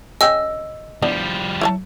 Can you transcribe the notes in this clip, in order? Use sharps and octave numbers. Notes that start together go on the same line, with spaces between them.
C#3 D#5 G5 G#5 E6
F3 G3 B3 D4 E4
E4 C#5 A5